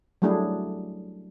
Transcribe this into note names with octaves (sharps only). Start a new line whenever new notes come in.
F#3 G3 A3 D4 E4 G#4